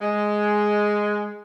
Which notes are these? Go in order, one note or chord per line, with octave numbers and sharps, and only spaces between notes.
G#3